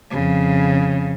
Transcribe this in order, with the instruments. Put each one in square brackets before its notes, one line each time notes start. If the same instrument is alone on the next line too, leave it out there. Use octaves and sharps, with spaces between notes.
[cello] F2 C#3